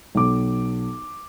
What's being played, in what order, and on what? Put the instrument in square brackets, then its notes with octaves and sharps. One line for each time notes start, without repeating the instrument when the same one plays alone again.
[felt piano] B1 D6